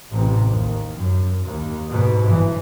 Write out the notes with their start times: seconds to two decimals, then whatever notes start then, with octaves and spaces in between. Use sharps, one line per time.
0.10 A1 C3
0.50 D#2
0.94 F#2
1.43 D#2
1.88 G#2 B2
2.23 G1 E3